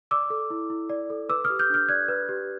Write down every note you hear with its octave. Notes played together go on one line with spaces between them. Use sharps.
D5 D6 E6
A4
E4
E4
D5
A4
B4 D6 E6
D#6 F6
G4
F6 G6
D4 F6 G6
D5 F#6 G#6
B4
G4